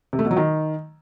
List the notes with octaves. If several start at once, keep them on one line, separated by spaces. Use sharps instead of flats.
C3
A3
B2
F#3
D#3